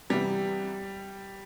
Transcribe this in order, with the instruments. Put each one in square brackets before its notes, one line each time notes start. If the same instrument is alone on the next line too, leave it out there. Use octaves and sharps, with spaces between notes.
[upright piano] C3 E3 B3 E4 [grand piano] G3